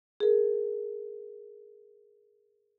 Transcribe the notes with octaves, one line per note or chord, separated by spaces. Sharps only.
G#4 A#4